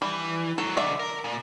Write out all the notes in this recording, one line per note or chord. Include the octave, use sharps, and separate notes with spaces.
E3 G3
G#2 F#3 A4
B1 D3 D5 E5
A#4
A#2